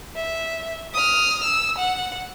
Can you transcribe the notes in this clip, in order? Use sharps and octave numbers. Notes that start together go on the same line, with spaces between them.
E5
D#6 F6
E6
F#5